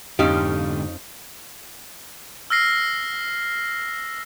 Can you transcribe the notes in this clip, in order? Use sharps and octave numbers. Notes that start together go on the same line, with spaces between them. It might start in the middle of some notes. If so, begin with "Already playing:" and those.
F2 G#2 D3 C#4 D#4 G4 F5
E6 F6 A#6 C7